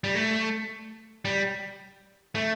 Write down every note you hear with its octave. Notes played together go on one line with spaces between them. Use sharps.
G3
A3
G3
A3